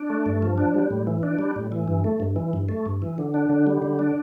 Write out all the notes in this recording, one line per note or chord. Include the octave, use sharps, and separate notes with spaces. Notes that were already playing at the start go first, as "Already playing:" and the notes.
Already playing: D4
A3
G2
F3
D4
G3
A2
E3
D4
G3
A2
E3
G2
A3
G2
E3
G2
A3
G2
E3
D3
D4
D3
G3
D3
D4